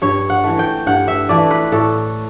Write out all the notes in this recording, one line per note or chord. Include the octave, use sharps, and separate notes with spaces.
G2 C#5
F#5
E3 A3
G5
G2 F#5
E5
E3 A3 D5
B4
A2 A4